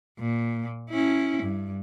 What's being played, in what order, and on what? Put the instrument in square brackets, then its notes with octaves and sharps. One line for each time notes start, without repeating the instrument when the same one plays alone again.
[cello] A#2
C#4 E4
G2